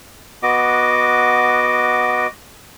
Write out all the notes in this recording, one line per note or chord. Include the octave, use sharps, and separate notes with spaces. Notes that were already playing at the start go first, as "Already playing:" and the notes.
B3 F#4 D#5 D6